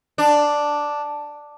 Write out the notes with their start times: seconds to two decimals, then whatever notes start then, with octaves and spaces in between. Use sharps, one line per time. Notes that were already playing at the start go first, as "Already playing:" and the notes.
0.18 D4